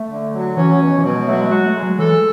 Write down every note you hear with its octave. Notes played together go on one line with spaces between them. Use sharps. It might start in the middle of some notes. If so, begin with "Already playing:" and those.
Already playing: A3
D3
F#3
E3 C#4
B2
E3
B2 F#3
G#3
F#3 A3
G#3
A3
G#3 F#4
A3
G#3
F#3
E3 A4